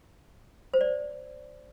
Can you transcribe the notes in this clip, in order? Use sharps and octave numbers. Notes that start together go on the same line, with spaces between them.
C5
D5